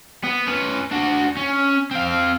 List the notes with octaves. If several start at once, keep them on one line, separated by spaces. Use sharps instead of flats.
B3
C#4 B4
D4 F#4
C#4
C4 F5